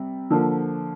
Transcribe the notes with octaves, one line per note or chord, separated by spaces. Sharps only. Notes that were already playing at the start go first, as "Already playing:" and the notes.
Already playing: C3 G3
D3 F3 A#3